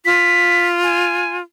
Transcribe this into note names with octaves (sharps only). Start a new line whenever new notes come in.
F4 B6
G#5